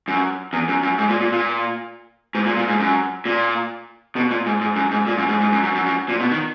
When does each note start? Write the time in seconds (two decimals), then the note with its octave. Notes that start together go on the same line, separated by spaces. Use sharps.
0.08 F#2
0.53 E2
0.68 F#2
0.83 F#2
0.98 G#2
1.09 A#2
1.21 A#2
1.32 A#2
2.35 G#2
2.46 A#2
2.57 A#2
2.68 G#2
2.80 F#2
3.25 A#2
4.16 B2
4.31 A#2
4.46 G#2
4.61 G#2
4.76 F#2
4.91 G#2
5.07 A#2
5.18 F#2
5.29 G#2
5.41 G#2
5.52 F#2
5.63 F#2
5.75 F#2
5.86 F#2
6.09 A#2
6.20 B2
6.31 D#3